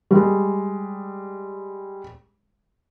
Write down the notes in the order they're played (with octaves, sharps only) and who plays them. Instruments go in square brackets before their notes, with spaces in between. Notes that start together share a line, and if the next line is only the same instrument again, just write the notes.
[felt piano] G3 G#3